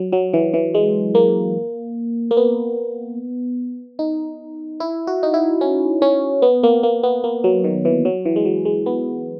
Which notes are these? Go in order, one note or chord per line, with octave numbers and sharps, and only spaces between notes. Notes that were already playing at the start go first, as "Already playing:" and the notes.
Already playing: F#3
F#3
E3
E3
G#3
A#3
A#3
B3
D#4
E4
F#4
D#4
E4
C#4
C#4
B3
A#3
A#3
B3
A#3
F#3
D#3
E3
F#3
E3
G#3
F#3
G#3
B3